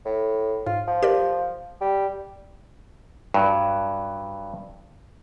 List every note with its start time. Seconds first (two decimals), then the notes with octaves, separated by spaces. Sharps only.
0.05 A2
0.66 G#2 F4
0.88 F3
1.03 G4 A#4 D5
1.81 G3
3.34 G2 F#3